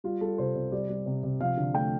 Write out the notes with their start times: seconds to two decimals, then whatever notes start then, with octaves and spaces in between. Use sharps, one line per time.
0.04 G3 F4
0.21 G3 A4
0.38 C3 C5
0.55 C3
0.72 G3 D5
0.89 G3
1.06 C3
1.23 C3
1.40 F3 F5
1.57 D3
1.74 A3 G5